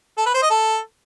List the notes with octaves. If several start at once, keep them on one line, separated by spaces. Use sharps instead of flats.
A4
B4
C5
D#5
A4